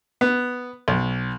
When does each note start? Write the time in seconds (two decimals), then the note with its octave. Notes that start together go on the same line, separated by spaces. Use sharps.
0.21 B3
0.88 B1